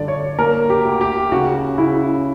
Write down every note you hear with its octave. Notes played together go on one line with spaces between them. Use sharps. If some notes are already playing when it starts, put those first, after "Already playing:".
Already playing: G2 D3 D5
C#5
A#3 A#4
G4
D2
G4
C#3 F#4
C#3 E4